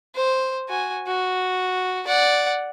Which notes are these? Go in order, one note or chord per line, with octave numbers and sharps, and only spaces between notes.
C5
F#4 G#5
F#4
D5 F#5